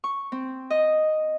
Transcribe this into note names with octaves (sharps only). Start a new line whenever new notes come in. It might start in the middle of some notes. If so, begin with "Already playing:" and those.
C#6
C4
D#5